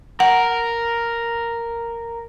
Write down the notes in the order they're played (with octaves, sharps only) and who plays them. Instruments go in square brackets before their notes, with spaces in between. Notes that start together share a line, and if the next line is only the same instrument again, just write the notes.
[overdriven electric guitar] A#4 [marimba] F#5